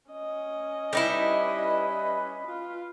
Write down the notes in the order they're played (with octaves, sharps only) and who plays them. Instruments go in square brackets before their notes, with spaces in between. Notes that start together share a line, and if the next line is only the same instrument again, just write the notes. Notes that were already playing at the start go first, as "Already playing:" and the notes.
[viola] C#4 D#5
[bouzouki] G3 D#4 E4 [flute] B4
[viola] F4